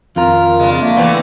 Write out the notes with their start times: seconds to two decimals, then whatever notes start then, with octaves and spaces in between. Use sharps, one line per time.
0.16 F2 D#3 F4 A#4
0.59 C#3 G#3 D4
0.81 A3 A#3
0.97 D3 E3 B3 C4